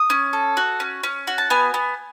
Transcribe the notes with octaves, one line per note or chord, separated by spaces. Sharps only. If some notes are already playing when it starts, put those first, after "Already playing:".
Already playing: D#6
C#4
A4
F#4
C#4
C#4
F#4
A5
B3 G#5
B3